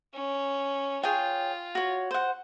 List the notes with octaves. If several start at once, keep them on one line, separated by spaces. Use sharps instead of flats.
C#4
F4 G#4 C#5 G5
F#4 C#5
C5 F#5